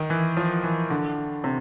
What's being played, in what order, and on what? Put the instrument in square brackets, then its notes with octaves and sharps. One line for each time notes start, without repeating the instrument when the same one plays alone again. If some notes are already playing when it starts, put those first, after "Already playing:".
Already playing: [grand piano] D#3
E3
F3
E3
D3
C3